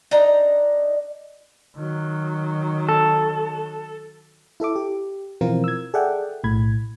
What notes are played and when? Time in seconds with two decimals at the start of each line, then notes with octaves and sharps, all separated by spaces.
0.11 D4 D#4 A#5
1.76 D#3 F#3
2.89 A4
4.60 E4 A4 E5 D6
4.76 G4
5.41 B2 E3 F3 C4 F4 A#4
5.64 E6 G#6
5.94 G#4 A4 D5 E5 F#5 G5
6.44 B1 A2 B5 G#6